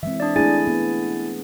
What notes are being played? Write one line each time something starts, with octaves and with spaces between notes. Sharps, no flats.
E3 G#3 C4 E5
D4 D5
A3 D4 E4 G#4 G#5 A6
B3